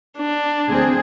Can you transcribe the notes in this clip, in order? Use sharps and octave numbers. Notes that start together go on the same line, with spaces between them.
D4
D2 C4 G#4